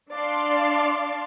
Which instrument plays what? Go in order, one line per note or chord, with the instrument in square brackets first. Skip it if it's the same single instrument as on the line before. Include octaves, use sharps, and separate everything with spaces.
[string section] D4 D5 F5 A5 C6